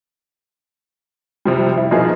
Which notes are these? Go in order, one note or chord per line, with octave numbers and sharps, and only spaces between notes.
C3 F3 G3
E4
B2 F3 A#3 D#4 F4 G#4